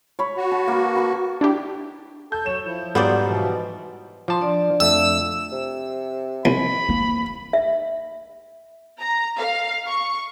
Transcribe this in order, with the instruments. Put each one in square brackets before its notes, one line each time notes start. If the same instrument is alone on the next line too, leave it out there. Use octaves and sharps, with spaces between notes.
[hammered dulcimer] C#5 B5
[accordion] F#4
[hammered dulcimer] A5
A#3 B4
B4 A5
[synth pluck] D4 E4 G4
[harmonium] A4 A5 [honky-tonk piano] G6
[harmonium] F#3 C#5 [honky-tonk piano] E7
[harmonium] F3 E4
[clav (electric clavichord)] G#2 F#5 [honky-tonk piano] F#3 G3 [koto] B3 C5 D5 [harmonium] F4
[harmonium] B2 E3 F3
[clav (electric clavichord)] F3 A5 [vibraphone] C6 D6
[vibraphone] D4 D5
[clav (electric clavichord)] F2 A3 [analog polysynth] E6
[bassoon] C3
[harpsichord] C2 [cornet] B5
[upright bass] A#3
[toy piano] E5
[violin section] A#5
F5
C#6